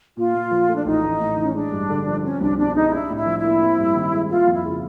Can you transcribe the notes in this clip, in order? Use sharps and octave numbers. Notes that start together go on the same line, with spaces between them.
A#2 F4
A#2
F3
A3
D4
A1 D#4
A1
A2
E3 C#4
G#3 D4
G2
D3
F3
C4 C#4
C2 D4
B2 D4
G#3 D#4
D4 E4
A2
E4
F3
E4
A#3
C4
G2
D#3
G#3
A#3 F4
F2
E4
C#3